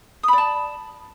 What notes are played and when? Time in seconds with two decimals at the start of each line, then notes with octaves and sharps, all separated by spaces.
0.23 D#6
0.28 B5
0.33 D5
0.38 A5